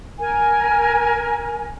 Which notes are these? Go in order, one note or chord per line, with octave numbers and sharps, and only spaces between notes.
A#4 G#5